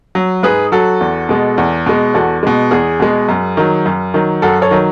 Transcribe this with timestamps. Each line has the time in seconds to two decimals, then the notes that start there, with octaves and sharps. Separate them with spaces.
0.15 F#3
0.43 G#2 G#4 B4
0.72 F#3 F#4 A4
1.01 E2
1.29 B2 G#3
1.58 E2
1.86 B2 G#3
2.14 E2 F#4 A4
2.43 B2 G#3
2.71 E2 G#4
3.00 B2 G#3
3.29 F#2
3.57 D#3 F#3
3.86 F#2
4.14 D#3 F#3
4.42 F#2 F#4 A4
4.62 A4 C#5
4.71 D#3 F#3